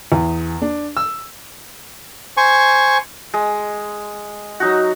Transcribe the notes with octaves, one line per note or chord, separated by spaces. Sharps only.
E2
D4
E6
C5 G#5 C#6
G#3
F#3 D#4 F#4